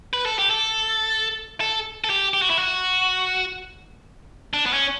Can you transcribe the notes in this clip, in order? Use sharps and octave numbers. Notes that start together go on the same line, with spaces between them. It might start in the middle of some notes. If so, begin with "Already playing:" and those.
B4
A4
G4
A4
A4
A4
G4
G4
F#4
E4
F#4
D4
B3
C#4